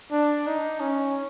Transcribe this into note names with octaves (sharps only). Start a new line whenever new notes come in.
D4
D#4
C#4